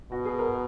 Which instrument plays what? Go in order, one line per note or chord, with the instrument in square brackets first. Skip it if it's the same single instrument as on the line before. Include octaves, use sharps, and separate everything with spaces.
[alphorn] B2 [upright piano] F#4
[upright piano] G#4
A#4